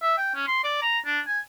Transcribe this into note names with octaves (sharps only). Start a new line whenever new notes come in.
E5
G5
C#4
C6
D5
A#5
D4
G#5